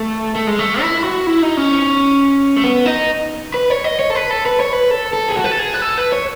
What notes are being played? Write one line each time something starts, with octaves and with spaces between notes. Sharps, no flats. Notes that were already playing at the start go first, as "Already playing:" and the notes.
Already playing: A3
A3
G#3
A3
E4
F#4
E4
D#4
C#4
A3
B3
D#4
B4
C#5
D#5
C#5
A4
B4
A4
B4
C#5
B4
A4
A4
G#4
F#4
B4
A4
G#4
B4
A4
B4
C#5